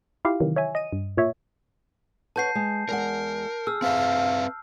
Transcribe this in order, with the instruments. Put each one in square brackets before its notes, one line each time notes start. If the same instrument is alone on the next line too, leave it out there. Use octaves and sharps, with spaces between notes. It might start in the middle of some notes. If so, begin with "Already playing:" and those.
[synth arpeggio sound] E4 F4 G4 F5
C3 D#3 E3 F#3
C#5 E5 G#5
D#5 D#7
G2
A#2 C#5 E5
[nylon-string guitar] B4 C#5 F#5 [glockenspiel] A5 G6 C7
[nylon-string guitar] G#3
[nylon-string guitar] E2 G#3 F#5 [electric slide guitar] A#4
[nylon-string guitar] G#4 [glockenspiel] E6 F6
[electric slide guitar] C4 B4 E5 [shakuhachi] F5